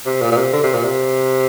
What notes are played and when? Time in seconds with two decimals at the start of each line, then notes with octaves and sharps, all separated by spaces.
0.06 C3
0.22 A#2
0.32 A#2
0.37 C3
0.53 D3
0.63 C3
0.74 A#2
0.84 C3